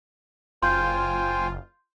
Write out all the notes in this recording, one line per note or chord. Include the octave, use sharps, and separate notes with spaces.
F#1 F4 C5 G5 G#5 C6 G6